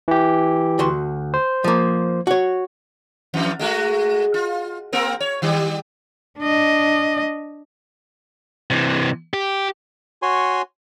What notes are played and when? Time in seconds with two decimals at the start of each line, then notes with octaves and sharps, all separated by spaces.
0.08 E3 G4
0.79 D2 F#4 C6
1.34 C5
1.64 F3 A#3
2.27 F#4 C#5
3.34 F2 E3
3.59 G#3 A3 F#4
4.34 F4
4.93 A#3 C4 A#4
5.20 C#5
5.42 D#3 G3 G4
6.39 D4 D#5
8.70 C3 E3
9.34 G4
10.22 F#4 C#5 G#5 C6